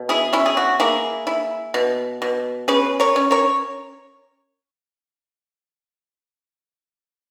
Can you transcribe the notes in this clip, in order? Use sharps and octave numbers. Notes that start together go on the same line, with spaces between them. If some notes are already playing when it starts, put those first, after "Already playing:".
Already playing: B2
E4 G#4
C#4 E4
G#4
F#4
A#3 E4 G#4
E4
B2
B2
C#4 G#4 B4
A#4 C#5
C#4
A#4 C#5